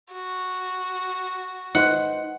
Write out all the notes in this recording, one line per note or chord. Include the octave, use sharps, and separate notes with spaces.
F#4
D#4 B4 C5 F#5